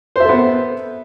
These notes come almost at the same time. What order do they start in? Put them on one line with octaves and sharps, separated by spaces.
C5 E5 A4 B3